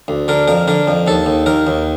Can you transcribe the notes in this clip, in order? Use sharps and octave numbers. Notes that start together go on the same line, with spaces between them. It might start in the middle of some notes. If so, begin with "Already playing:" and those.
D2
D3 A#4
F2 A#4
D3 A#4
F2
D#2 A4
D#2
D#2 A#4
D#2